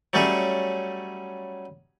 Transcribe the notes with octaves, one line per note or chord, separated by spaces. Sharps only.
F#3 G3 A3 C#4 G#4